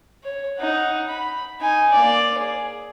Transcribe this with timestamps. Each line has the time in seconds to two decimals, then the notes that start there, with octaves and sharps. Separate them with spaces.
0.23 C#5
0.58 D#4 F#5
1.08 B5
1.60 D#4 G#5
1.93 A#3 D5
2.38 G#4